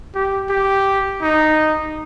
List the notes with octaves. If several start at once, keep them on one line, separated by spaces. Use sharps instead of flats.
G4
G4
D#4